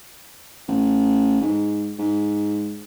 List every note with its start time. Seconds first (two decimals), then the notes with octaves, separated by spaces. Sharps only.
0.68 A1
1.41 G#2
1.99 G#2